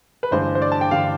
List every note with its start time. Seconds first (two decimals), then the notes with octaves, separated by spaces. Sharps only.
0.23 B4
0.31 A1 G2 D3 C5
0.55 C5
0.62 D5
0.72 A5
0.81 G5
0.91 A1 G2 D3 F5